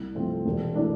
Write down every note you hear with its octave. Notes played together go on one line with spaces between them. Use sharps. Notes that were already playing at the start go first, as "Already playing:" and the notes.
Already playing: C2
C3 F3 A3 C4
E1
E3 A3 D4